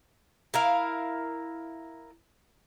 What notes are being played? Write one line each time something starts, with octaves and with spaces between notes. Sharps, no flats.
E4 A#4 F5